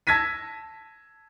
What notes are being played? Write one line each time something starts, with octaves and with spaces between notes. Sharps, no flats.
A5 E6 G#6 A#6 B6 D#7